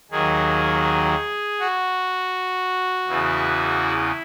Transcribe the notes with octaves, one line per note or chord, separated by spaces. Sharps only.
D#2 D#3 F#3 G#4
F#4
E2 C#3 E3
E4